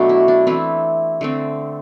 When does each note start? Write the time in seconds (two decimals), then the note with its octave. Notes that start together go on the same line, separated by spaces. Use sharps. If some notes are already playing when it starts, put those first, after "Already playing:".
Already playing: B2 F#3 A3 D4 F#4
0.09 E4
0.28 D4
0.47 E3 A3 C4 E4
1.21 D3 A3 C4